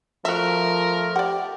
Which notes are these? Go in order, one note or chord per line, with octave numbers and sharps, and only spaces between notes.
F3 A3 F#4 A#4 E5
G4 D5 F#5